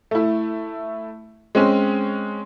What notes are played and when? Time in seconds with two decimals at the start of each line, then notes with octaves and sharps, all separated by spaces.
0.11 A3 E4
1.55 G#3 C4 C#4